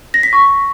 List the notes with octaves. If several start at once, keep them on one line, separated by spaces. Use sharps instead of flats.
A#6
B6
C#6